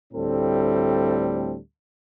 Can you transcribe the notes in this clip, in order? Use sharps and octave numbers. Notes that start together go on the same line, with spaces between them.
D2 A2 G3 C4 A4